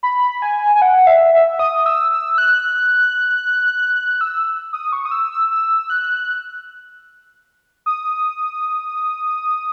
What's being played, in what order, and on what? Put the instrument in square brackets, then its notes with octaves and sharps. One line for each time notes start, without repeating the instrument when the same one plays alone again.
[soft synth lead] B5
G#5
G#5
F#5
E5
E5
D#6
E6
E6
F#6
F#6
E6
D#6
C#6
D#6
E6
E6
E6
F#6
D#6